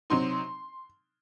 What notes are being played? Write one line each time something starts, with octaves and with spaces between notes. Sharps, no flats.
C3 F#3 C4 D#4 C6